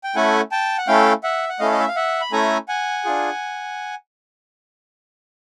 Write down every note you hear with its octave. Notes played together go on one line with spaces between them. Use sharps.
G5
A3 C#4 E4 A4 F#5 G#5
G5 A5
F#5
A3 C#4 E4 A4 F5 G5
E5 F#5
F#5
A3 C#4 E4 A4 D#5 F5
D#5
E5
F5
E5 F#5
B5
A3 C#4 E4 A4 G#5 A#5
F#5 G#5
D4 F4 G#4